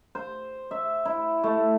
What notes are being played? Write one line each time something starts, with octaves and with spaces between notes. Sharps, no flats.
C5
E5
E4
A3